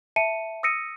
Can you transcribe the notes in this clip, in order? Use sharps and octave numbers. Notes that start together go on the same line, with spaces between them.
E5 A5 C#7 D#7
D#6 E6 A#6 C#7 D#7